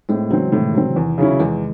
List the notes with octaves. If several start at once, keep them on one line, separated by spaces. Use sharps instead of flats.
A2 G#3 C4
C#3 E3 F#3 C4
A2 C3 D#3
F#3 C4
E2
C#3 F#3 C#4 E4
E2 E3 G#3